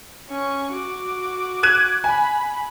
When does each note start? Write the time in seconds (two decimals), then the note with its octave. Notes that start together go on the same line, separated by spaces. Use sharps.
0.30 C#4 C#6
0.72 F#4 D6
1.63 F#6 G#6 D#7
2.04 G#5 B5